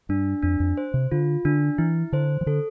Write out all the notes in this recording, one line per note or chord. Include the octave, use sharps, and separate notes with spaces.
G2 D4
F2 D4
F2
C5
C3
D3 F4
D3 D4
E3 E4
D3 C5
E3
D3 A4